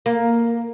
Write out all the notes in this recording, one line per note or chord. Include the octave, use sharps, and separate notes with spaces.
A#3